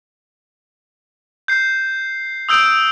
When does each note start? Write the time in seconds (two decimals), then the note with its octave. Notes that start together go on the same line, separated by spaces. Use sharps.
1.48 G6 C7
2.49 D#6 E6 G6 D7